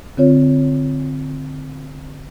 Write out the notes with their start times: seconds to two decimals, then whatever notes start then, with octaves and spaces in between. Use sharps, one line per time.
0.17 D3 C4 F4 C#5